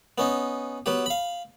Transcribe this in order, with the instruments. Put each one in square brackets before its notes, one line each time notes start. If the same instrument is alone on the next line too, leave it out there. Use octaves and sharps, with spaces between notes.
[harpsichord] B3 C#4 D#4
F#3 B3 G4
F5 B5